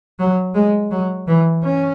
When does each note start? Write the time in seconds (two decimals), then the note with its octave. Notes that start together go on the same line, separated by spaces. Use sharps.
0.19 F#3
0.54 G#3
0.91 F#3
1.27 E3
1.63 C#4